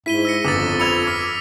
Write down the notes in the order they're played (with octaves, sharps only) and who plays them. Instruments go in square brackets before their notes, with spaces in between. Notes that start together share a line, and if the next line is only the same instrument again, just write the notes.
[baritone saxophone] G#2 [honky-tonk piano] E4 [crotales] B6 D#7 G7
[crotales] E6 A#6 C#7
[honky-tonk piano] G1 [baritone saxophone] F2 [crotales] D6 D#6 A6
[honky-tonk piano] B5 E6 G#6 [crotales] C#7 F7
[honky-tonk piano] D6 [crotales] F6 B6